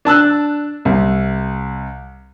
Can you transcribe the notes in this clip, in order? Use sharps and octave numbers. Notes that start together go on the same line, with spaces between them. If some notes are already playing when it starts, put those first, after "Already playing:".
D4 A5 E6 F#6
C2